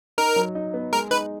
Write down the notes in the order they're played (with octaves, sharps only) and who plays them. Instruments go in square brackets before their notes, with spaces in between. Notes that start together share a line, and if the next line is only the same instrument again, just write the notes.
[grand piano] D#4 [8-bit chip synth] A#4
[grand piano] F#3
D#4
B3
[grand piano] G#3 [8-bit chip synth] A#4
[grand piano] D#4 [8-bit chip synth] B4